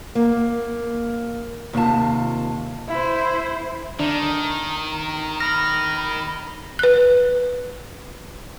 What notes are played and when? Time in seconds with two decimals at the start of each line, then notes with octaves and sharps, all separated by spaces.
0.15 A#3
1.73 D#2 C3 F4 A5
2.89 E4 C5
4.00 D#3 D4 A#5
5.40 B5 F6 A#6
6.79 B4 F#6